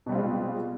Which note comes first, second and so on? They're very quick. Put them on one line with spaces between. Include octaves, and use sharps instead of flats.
B2 G3 C4 F4 G#3